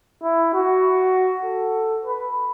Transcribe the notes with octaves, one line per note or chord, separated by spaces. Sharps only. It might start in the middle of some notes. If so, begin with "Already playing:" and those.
E4
F#4
A4
B4